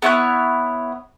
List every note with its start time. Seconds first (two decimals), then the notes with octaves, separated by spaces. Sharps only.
0.02 B3 E4 C#5 F#6